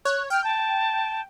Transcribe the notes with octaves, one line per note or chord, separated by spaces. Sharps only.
C#5 F#6
G5 F6
A5